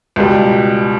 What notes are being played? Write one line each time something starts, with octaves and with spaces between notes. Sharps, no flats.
C#2 B2 G3